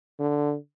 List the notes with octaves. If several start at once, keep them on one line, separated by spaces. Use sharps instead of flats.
D3